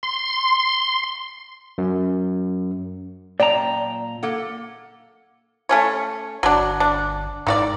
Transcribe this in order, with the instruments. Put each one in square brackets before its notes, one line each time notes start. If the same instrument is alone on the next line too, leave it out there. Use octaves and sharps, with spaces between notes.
[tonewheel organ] C6
[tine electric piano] F#2
[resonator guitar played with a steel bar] F#2 G5 A5 [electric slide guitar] A#2 A#5 [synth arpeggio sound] D5
[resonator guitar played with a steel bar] A#3 A4 F#5
[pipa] A3 C#4 C#5
[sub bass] G1 [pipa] F#3 D4
[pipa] D4
[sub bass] G#2 [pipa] D#3 F#4 D5